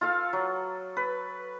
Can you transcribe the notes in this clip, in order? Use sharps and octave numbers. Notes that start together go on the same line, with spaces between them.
F4 A4 F5
F#3
B4